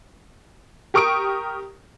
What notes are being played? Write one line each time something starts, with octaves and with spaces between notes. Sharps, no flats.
G4 A#4 C#6 D#6 D7